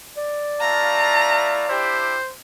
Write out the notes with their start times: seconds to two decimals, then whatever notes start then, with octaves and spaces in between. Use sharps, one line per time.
0.17 D5
0.60 A3 E4 F5 A5 A#5
1.69 D4 E4 G4 C5